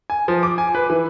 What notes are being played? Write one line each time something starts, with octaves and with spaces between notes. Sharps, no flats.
G#5
F3
D6
G#5
B4
E3